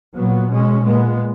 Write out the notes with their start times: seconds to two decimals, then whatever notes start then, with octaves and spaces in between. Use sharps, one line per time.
0.16 A#2 F#3 B3
0.50 B2 G#3 C#4
0.85 A#2 G#3 B3